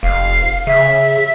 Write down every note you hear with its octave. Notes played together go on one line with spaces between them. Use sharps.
F1 F5
C#3 E5